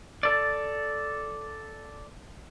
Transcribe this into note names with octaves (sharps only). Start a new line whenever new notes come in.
A4 D5